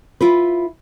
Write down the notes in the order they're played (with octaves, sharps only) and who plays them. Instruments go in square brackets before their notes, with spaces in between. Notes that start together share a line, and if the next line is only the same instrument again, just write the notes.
[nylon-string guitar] E4 F4 B4